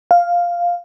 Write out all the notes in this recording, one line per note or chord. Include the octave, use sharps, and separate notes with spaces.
F5